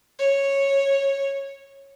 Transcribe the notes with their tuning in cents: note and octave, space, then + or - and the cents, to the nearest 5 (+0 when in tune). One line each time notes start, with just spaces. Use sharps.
C#5 -10